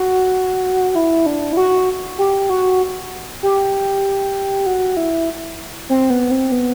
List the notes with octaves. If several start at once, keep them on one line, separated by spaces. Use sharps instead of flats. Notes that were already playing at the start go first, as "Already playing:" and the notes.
Already playing: F#4
E4
D4
E4
F#4
G4
F#4
G4
F#4
E4
C4
B3
C4
B3